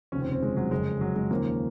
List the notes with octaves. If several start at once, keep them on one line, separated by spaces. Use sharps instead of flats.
F1 D#2 C#3 F3 C#4
C4
C4
G#3
F#3
F#1 F2 C#3 F3 G#3
F#3
G#3
D#2 C#3 F3 A#3